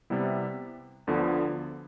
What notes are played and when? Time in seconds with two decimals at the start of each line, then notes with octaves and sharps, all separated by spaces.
0.10 C3 G3 B3 E4
1.07 D2 D3 F3 B3